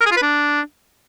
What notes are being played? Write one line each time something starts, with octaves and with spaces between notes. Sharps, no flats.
A#4
G#4
F4
B4
D4